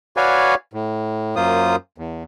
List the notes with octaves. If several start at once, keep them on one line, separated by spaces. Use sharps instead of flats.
F#4 B4 C#5 D5 F5 G#5
A2
F#2 A#3 F4 C5 D#6
E2